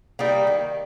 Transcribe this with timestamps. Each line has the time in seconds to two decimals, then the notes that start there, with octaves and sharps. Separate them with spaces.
0.19 G3 A#3 D#4
0.47 D#3